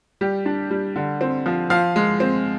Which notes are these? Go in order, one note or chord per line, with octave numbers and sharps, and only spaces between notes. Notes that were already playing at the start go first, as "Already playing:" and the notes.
G3 G4
D4
G3
D3
C4
F3
F3 F5
G#3
C4